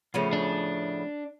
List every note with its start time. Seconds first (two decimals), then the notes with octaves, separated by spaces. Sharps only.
0.14 A2 C#3 F3 A3 B3 C#4
0.33 D4